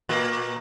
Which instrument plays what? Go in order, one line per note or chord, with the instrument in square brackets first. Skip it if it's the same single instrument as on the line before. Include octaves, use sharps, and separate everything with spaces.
[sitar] A#2 A#3